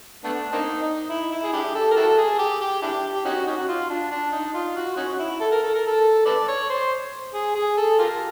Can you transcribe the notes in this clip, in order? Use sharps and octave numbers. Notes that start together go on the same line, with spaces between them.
A3 B3 D4
A#3 C4 D#4
D#4
E4
E4
G#4
D4 E4 G4
A4
A#4
E4 F#4 A4
G#4
G4
G4
D4 E4 G4
G4
C#4 D#4 F#4
C#4 D#4 F#4
F4
D4
D4
D#4
F4
F#4
C#4 D#4 F#4
E4
A4
A#4
A4
A#4
A4
A4 B4 D5
C#5
C5
G#4
G#4
A4
F4 G4 A#4